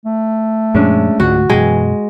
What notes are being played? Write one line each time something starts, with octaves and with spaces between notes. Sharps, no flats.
A3
F#2 A#2 F3 G#3 C#4 D4
C#2 G#2 D3 A3 F#4
F#2 B2 E3 G#3 G5 G#5